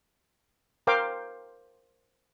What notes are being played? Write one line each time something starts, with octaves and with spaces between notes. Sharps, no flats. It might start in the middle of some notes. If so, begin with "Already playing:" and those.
A#4 C5 F5 G5 D6